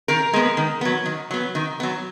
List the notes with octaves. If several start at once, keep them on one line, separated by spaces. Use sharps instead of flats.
D#3 A#4
G#3 B3
D#3
F#3 B3
D#3
F#3 B3
D#3
F#3 B3